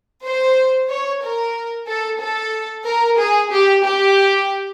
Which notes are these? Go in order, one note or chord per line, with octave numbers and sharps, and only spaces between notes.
C5
C#5
A#4
A4
A4
A#4
G#4
G4
G4